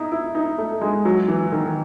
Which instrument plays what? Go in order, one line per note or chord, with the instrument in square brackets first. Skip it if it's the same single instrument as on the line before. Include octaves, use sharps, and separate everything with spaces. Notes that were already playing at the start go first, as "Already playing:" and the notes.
Already playing: [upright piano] D#4 E4
E4
D#4
A3
G#3
F#3
E3
D#3